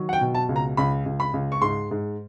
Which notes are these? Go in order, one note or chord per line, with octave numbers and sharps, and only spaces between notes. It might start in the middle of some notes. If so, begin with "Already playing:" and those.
Already playing: D#3 F#3
F#5
G5
B2
A5
C#2
A#5
C#2 B5
C#2
B5
C#2
C#6
G#2 C6
G#2